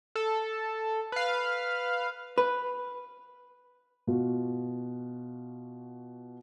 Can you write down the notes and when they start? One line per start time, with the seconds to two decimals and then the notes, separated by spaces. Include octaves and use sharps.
0.15 A4
1.12 B4 F5
2.38 B4
4.07 B2 F4 F#4